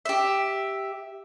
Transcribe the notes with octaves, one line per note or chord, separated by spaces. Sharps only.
G4 E5